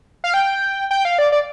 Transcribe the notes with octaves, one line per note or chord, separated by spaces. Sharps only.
F5
G5
G5
F5
D5
D5